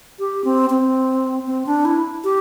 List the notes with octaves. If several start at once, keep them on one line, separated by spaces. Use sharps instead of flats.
G4
C4
C4
C4
D4
E4
G4